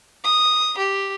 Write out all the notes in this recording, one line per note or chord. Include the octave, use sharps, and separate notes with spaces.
D#6
G4